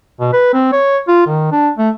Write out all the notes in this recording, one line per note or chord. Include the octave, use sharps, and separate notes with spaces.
B2
B4
C4
C#5
F4
D#3
D4
A3